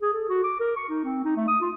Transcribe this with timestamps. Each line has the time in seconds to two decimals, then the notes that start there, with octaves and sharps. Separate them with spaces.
0.02 G#4
0.14 A4
0.29 F#4
0.44 D6
0.60 A#4
0.76 C#6
0.89 D#4
1.04 C4
1.25 D#4
1.37 A3
1.48 D#6
1.61 F4